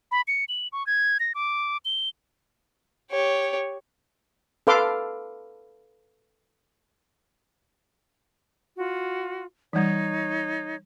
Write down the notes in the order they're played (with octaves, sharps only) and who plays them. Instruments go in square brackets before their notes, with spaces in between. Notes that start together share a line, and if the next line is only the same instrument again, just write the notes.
[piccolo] B5
C#7
F#7
C#6
G#6
A#6
D6
G7
[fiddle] G4 C#5
[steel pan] A4 B4 F5 C6 D6
[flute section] F4 F#4
[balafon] E3 G3 [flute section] D#4 C#5